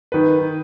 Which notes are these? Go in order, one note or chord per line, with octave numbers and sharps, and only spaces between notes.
D#3 B4